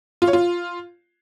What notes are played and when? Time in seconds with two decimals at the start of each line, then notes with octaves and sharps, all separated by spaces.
0.22 F4
0.28 C#5
0.33 F4